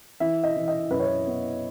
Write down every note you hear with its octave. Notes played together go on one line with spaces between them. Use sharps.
E3 E5
D#5
E3
D#5
F#2 B4
C#5
B4
B3